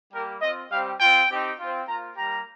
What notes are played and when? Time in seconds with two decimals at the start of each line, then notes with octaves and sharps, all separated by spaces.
0.13 G3 A#3 G4 A#4
0.42 C4 F4 D#5
0.72 G3 C4 G4 F5
1.01 C4 F4 G5
1.30 C4 D#4 G4
1.59 C4 F4
1.88 A#3 F4 A#5
2.17 G3 A#3 G4 A#5